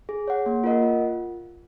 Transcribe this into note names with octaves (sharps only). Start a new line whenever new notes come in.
G#4
C#5 F#5
A#3
F4 A#4 D#5 F#5
F4